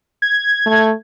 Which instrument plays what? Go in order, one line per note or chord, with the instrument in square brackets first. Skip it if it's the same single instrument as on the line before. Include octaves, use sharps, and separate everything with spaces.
[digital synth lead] G#6
[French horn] A3